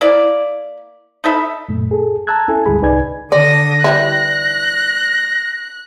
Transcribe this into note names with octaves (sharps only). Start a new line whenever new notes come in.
A#3 E4 D5
D#4 A4 E5 B5
F#2 A#2 A3
G#4 A4
A5 A#5 E6 F#6 G#6
C#4 E4 A4 G#5
D2 G#2 D3 G3 G#4 B5
C2 D#4 B4 D5 G#5 G#6
D3 D5 D#6 A#6
E3 G3 E4 F#6